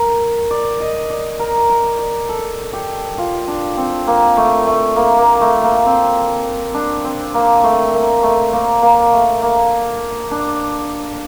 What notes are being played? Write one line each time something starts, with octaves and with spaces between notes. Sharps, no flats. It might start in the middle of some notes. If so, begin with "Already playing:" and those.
Already playing: A#4
D5
D#5
D5
A#4
A#4
D5
A4
G4
F4
D4
C4
A#3
A3
A3
A#3
A#3
A3
A#3
C4
D4
C4
A#3
A3
A#3
A3
A#3
A#3
A3
A#3
D4